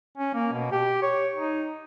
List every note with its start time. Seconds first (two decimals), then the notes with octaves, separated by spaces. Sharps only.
0.18 C#4
0.34 A#3
0.53 B2
0.72 G4
1.02 C#5
1.35 D#4